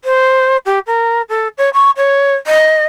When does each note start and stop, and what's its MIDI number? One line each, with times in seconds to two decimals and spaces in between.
0.04 0.57 72
0.65 0.79 67
0.87 1.22 70
1.29 1.48 69
1.58 1.69 73
1.73 1.90 85
1.97 2.35 73
2.47 2.86 75